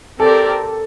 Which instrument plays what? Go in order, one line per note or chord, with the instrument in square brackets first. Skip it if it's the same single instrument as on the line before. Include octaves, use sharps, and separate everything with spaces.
[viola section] C4 G4 A#4 D5 [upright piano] A4